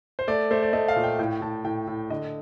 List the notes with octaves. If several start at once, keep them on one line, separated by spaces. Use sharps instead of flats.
C5
A3 D5
A3 C5
D5
A3 D#5
F5
A#2
G5
A2 G5
A2 A5
A2 G5
A2
D3 D#5